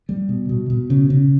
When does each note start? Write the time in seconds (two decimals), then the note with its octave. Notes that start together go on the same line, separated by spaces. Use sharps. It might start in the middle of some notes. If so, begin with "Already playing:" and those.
0.09 G3
0.29 B2
0.49 B2
0.70 B2
0.90 C#3
1.10 C#3